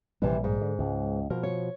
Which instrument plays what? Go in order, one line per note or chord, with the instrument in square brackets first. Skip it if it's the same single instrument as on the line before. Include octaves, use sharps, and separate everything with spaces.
[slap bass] A#1 G3 [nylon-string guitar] C3 E3
[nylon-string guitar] G#2
[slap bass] D3
C#2
[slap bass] B2 F3 [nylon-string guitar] A#4
[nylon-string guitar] C#5